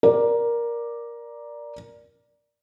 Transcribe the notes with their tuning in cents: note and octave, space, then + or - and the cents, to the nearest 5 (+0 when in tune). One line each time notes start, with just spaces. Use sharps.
A#4 +10 D5 +0